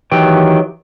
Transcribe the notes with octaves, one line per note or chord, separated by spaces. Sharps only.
D#3 E3 F#3 G4 G5